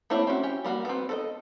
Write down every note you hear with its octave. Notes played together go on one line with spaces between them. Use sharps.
A3 A#3 C4 E4 C#5
C4 C#4 F#4
C#4 G4
G3 A#3 F#4
B3 C4
A4 B4 D#5